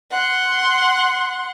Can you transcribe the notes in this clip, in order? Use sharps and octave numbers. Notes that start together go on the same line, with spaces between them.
F#5 C6